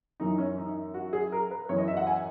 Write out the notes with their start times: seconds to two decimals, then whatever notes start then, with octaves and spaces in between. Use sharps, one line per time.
0.20 F#2 E3 D#4
0.38 C#4
0.58 D#4
0.94 F#4
1.13 G#4
1.32 A#4
1.51 B4
1.69 F#2 E3 C#5
1.78 D#5
1.88 E5
1.97 F#5
2.07 G#5